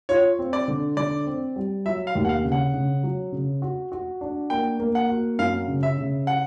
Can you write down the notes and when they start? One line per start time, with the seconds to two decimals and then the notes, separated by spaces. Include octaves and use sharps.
0.09 F4 C#5
0.39 C4
0.53 D5
0.68 D3
0.97 D3 D5
1.27 C4
1.56 G3
1.86 F#3 E5
2.07 F5
2.15 D#2
2.25 F#5
2.29 F5
2.45 C#3
2.52 F#5
2.74 C#3
3.03 F#3
3.32 C#3
3.62 F#4
3.92 F#4
4.21 D4
4.50 A#3 G5
4.80 A#3
4.95 F#5
5.10 F#4
5.39 F#2 F5
5.68 C#3
5.83 E5
5.98 C#3
6.27 F#5